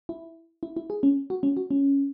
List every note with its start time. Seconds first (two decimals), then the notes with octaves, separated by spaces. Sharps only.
0.09 E4
0.63 E4
0.76 E4
0.90 G#4
1.03 C#4
1.30 F#4
1.43 C#4
1.57 F#4
1.71 C#4